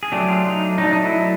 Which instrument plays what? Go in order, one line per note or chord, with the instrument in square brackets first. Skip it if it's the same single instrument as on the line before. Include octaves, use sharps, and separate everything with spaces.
[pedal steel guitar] G#4
F#3 A3 D4 G4
F4
D#4
F#3 A3 D4 D#4
D#4
E4